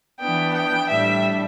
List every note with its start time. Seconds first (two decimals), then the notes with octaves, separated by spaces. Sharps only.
0.20 E3 B3 D4 G5
0.54 G5
0.90 A2 G3 D4 E5